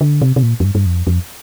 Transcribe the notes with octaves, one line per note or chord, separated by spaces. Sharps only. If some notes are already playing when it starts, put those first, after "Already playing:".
D3
C3
C3
A#2
F2
G2
G2
F2
F2